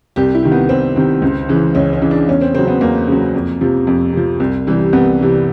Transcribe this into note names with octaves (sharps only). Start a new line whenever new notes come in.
C2 G4
E4
C3 D#3
B3
C2 C4
C3 D#3
C#2
C#3 E3
C#2 C#4
C#4
C#3 E3
D4
E2 C#4
C4
C#3 F#3 C4
B3
E2 A#3
C#3 F#3
F2
C3 F3
F2
C3 F3
C2
C3 E3 G3
C2 B3
C3 E3 G3